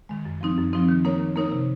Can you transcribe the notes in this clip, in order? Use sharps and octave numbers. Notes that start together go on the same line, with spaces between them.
D#3 G#3
F#2
F3 C4 D#4
F#2
F3 C4 D#4
D#3
A#3 D#4 A#4 C#5
D#3
A#3 D#4 A#4 C#5
C3